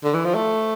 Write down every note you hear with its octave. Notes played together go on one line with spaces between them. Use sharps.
D3
E3
F3
A3